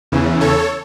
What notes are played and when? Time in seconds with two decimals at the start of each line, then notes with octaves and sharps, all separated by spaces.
0.12 E2 C#3 E3
0.41 A4 C#5